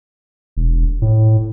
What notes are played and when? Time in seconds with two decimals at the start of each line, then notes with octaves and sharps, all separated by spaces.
0.57 E1
1.02 A2